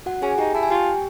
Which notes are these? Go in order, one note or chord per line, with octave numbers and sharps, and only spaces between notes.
F#4 F#5
C#4 G#4 G#5
D#4 G4 G5
E4 A5
G#5
F4 G4 G5